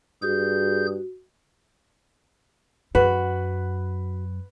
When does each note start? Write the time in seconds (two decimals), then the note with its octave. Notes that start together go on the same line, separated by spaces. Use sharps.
0.22 G2 F#4 G#4 G6
2.95 F#2 F#4 B4